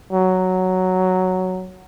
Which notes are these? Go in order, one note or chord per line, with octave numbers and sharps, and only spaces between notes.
F#3